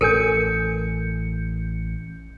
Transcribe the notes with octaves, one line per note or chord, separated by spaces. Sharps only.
A1 A4 A#4 G#5 G6 C#7